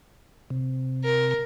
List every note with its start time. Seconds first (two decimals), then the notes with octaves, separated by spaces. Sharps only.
0.50 C3
1.05 A#4